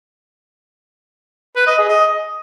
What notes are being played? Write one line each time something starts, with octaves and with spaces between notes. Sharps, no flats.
B4
D#5
G#4
D#5